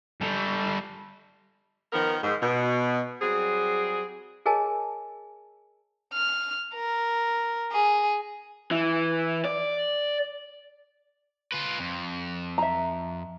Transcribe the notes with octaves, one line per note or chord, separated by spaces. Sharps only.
G3 A4
D#3 F3 B3 A#4
G#2
B2
F#3 G3 C4 G#4
G#4 A#4 C#5 D#5 G#5 A5
F6
A#4
G#4
E3
D5
F4 B4
F2
E5 A#5